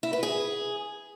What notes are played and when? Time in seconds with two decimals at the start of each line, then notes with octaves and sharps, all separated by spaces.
0.03 E4
0.13 B4
0.23 G#4